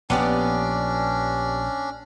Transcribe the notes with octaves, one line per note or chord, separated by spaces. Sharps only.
A#1 B3 C#4 D4 G4 D5